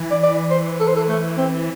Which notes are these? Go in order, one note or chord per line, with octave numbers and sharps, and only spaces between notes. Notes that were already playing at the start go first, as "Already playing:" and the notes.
Already playing: E3
D5
D5
C5
A4
C5
A4
A3
C4